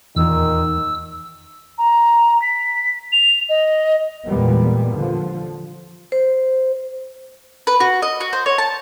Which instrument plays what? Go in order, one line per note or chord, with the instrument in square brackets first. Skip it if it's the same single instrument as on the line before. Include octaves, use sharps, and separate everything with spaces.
[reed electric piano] E2 [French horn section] A#2 D#3 [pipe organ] E6
[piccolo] A#5
B6
F7
D#5
[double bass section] E2 A#2 G3 G#3 A#3 B3
D3 F3
[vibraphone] C5
[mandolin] B4
F#4
D#5
F#4
C5
C#5
A5